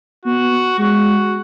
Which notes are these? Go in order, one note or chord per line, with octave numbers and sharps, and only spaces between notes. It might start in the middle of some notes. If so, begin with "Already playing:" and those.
B3 F#4
G#3 F#4